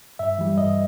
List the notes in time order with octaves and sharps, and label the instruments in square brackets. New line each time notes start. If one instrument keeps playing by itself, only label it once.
[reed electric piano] G2 E5
E3 G3
G2 D#5